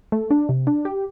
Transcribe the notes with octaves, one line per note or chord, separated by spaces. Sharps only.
A3
D4
C3
D4
G4